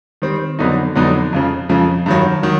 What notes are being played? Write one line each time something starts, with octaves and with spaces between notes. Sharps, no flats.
D#3 G3 C4
F2 D3 F#3 B3 D#4
F2 D3 F#3 B3 D#4
F2 C#3 F3
F2 C#3 F3
G2 D#3 F#3
D#3 F#3